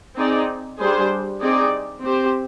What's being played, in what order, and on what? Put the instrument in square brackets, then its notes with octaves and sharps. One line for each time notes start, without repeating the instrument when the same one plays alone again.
[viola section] C4 D#4 G#4 D5
G3 D4 G#4 C5
C4 D#4 G#4 D5
C4 G4 C5